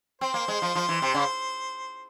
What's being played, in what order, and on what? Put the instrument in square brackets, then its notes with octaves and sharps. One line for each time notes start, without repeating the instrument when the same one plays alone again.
[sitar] C4 [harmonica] C5
[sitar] A#3
G#3
F3
F3
E3
C3
C#3